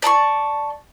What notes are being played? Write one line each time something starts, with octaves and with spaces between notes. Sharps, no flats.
D5 A5 A#5 C#6